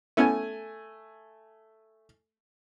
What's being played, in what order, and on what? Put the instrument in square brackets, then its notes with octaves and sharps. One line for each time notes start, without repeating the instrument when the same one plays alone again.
[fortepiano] A3 G#5 [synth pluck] B3 C#4 E4